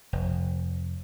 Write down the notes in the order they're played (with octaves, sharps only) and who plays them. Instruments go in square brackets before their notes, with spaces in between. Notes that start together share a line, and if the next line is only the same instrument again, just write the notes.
[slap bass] F1